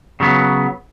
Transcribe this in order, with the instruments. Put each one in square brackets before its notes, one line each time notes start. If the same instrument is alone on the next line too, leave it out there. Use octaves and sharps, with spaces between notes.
[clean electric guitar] C#3 F#3 B3